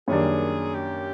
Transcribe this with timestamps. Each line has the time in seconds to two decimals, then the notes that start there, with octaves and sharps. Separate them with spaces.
0.08 F#2 D#3 G3 A#3 D4 G#4
0.75 G4